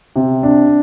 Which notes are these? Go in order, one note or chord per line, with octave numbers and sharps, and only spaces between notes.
C3
D4